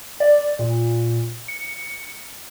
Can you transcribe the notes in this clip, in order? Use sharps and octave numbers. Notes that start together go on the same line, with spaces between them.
D5
A#2
C#7